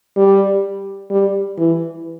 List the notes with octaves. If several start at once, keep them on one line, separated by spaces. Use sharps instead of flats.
G3
G3
E3